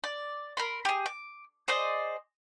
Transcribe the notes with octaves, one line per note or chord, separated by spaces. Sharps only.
D5
A#4 B5 C6
G4 G#4
D6
G#4 C5 D5 D#5